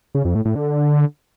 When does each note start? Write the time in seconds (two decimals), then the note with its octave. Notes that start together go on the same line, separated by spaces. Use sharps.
0.15 C#3
0.25 F2
0.35 A2
0.45 A2
0.55 D3